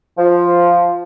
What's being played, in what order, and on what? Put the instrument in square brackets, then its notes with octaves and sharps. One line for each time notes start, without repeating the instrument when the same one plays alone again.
[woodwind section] F3